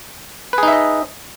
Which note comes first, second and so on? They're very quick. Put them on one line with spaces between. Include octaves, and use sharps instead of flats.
B4 G#4 D#4 E5 D#5